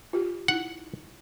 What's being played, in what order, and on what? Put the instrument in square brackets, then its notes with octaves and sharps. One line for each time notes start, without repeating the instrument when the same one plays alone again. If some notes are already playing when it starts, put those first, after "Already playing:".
[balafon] F4 G4
[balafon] D#4 E4 [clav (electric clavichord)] F#5